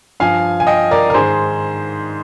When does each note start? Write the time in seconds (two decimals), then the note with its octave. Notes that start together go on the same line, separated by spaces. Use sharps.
0.20 G2 F3 F5 G#5
0.60 G#5
0.67 D#5 G5
0.91 A#4 D5
1.10 A#4
1.14 G#2 D#3 G#4 C5